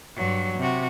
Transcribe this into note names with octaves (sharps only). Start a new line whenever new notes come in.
G2 F#3
C3 F#4